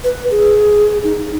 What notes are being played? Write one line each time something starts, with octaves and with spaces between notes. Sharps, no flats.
B4
G#4
D#4